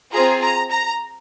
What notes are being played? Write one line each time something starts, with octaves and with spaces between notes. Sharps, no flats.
C4 F4 G#4 A#5
A#5
A#5